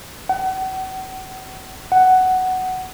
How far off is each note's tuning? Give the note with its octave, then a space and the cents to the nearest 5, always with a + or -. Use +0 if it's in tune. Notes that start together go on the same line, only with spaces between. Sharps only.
F#5 +40
F#5 +10